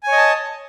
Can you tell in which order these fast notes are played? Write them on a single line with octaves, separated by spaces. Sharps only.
G#5 C#5 D#5 A5